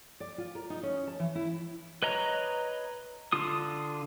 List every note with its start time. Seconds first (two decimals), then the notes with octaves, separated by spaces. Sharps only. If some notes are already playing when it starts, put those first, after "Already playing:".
0.20 D5
0.38 F4
0.55 A#4
0.70 D#4
0.83 C#4
1.07 A5
1.19 E3
1.35 E4
2.02 B4 C#5 D#5 A#5
3.32 D3 F4 D#6